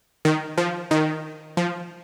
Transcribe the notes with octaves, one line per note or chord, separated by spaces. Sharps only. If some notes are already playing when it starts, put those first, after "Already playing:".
D#3
F3
D#3
F3